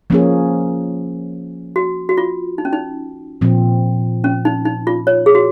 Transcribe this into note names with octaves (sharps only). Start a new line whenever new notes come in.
F3 A#3 C#4 G#4
F#4
F#4
F4
D#4
C#4
D#4
A#2 F3 C4
C#4
D#4
D#4
F4
C#5
G#4
F#4